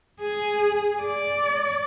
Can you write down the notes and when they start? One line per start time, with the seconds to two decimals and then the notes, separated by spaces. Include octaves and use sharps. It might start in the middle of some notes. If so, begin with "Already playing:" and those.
0.21 G#4
1.04 D5